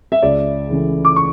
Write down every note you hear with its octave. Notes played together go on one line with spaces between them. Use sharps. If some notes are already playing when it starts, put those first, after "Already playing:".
E5
C#2 D5
C#3 E3 A3
D6
C#6